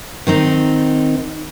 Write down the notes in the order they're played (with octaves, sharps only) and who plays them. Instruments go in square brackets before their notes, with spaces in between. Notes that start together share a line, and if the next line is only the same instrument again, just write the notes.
[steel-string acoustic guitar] D#3 C4 D#4